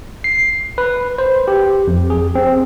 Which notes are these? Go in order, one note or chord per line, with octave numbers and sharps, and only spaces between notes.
C7
B4
C5
G4
F2
G#4
C4